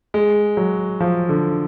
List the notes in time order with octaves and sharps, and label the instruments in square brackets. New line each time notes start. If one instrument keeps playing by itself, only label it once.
[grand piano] G#3
F#3
F3
D3